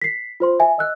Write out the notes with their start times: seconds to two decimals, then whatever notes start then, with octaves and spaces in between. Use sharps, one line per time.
0.02 B6 C7
0.40 F4 C5 C6
0.60 E5 G#5
0.78 D#5 E6 F#6